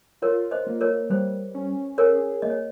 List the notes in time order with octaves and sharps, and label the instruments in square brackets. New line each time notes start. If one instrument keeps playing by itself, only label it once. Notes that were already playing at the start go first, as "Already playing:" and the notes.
[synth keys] F4 [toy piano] A#4 C#5
[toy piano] C5 D#5
[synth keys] A#3
[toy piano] A#4 C#5
[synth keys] G3 [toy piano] C5
[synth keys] C#4
[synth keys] G#4 [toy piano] A#4 C#5
[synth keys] A#3 [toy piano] D#5
[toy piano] C#5